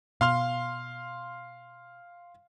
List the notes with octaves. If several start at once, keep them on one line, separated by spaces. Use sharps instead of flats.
B2 F5 C6 F6